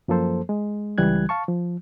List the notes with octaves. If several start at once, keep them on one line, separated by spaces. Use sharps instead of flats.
F#2 F3 A#3 A4 C5
G#3
C#2 E3 G3 F#6 G#6
F5 A5 C#6
F3